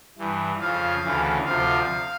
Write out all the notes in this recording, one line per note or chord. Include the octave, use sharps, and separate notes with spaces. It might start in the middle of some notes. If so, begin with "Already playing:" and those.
G2 E3
F2 C#3 F3 F5
D2 C#3 E3
D2 C3 F3 F5